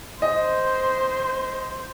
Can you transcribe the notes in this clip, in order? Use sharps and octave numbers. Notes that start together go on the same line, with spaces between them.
C5 D#5